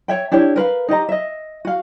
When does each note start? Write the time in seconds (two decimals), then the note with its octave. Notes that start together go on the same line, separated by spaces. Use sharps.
0.08 C#5 E5 G5
0.32 D4 E4 G4 C#5
0.56 A#4 B4 F5
0.88 D#4 G4 D#5 A#5
1.09 D#5 E5
1.65 F#4 F5